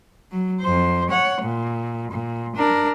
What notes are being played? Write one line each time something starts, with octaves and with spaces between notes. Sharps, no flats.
F#3
F2 C5
C#5 F#5
A#2
A#2
D4 A#4